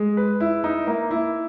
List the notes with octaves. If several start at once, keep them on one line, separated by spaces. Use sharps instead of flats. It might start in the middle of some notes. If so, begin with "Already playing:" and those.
Already playing: G#3
B4
E4
D#4
A#3
E4